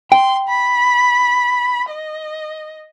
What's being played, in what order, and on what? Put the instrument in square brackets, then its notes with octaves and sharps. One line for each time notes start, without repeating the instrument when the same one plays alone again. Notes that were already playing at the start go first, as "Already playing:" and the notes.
[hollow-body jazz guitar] G5 [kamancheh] C6
[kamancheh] B5
D#5